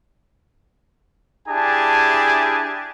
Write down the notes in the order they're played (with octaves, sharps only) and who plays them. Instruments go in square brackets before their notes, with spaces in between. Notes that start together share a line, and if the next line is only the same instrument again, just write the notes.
[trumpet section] D4 E4 G4 G#4 G#5 A5